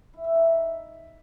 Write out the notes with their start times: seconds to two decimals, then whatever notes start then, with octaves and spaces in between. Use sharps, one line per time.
0.14 E4
0.24 E5
0.35 D#4
0.45 E5